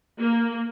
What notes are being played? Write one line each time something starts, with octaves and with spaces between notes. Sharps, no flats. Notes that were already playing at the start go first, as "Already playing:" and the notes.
A#3